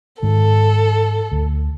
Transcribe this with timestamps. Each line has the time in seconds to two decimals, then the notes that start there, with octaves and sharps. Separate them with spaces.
0.23 G#2 D#3 A4
1.32 D2